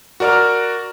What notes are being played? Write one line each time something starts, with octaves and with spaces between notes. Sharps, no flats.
F#4 A#4 D5 A#5 F6